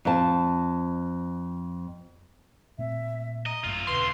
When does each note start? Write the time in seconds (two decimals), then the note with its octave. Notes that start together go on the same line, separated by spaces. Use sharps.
0.05 F2 A5
2.78 A#2 A3 C4 E5
3.46 D#5 A#5
3.64 A1 F#2 A2 A3 F4
3.87 D#1 C#3 B4 C6